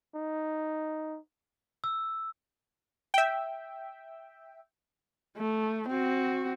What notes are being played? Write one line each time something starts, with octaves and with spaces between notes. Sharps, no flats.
D#4
E6
E5 G5
A3
C4 F#4